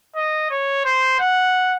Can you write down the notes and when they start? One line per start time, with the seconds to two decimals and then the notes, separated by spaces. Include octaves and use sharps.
0.16 D#5
0.50 C#5
0.85 C5
1.20 F#5